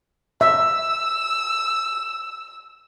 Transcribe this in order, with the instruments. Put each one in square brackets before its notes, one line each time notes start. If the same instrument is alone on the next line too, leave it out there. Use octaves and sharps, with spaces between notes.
[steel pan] E5 [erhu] E6